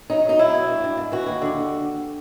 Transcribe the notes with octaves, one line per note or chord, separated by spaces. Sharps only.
F#3 D#4
F#3 D#4
F#3 E4
B2
G2
G2
G#2
E3 F#4
D#2
D3